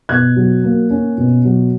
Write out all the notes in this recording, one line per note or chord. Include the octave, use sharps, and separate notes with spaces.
B2 F#6 G#6
F#3
A#3
C#4
B2
F#3